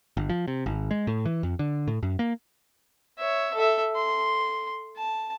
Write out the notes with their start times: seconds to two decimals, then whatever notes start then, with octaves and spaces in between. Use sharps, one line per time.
0.17 G1
0.30 F3
0.48 C3
0.66 G#1
0.91 G#3
1.07 A2
1.26 E3
1.43 F2
1.59 D3
1.87 A2
2.03 F#2
2.19 A#3
3.18 C#5 E5
3.54 A4 E5
3.96 C6
4.97 A5